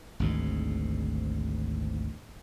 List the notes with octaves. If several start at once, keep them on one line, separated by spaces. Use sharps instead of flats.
G#1 D2 G#2